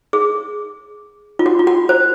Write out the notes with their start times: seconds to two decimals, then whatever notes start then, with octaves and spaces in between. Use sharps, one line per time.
0.13 G#4
1.39 F4
1.46 F#4
1.59 F4
1.67 F#4
1.89 C5